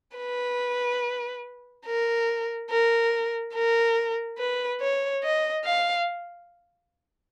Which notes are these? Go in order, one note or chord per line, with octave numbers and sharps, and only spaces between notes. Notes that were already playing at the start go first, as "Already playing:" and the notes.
B4
A#4
A#4
A#4
B4
C#5
D#5
F5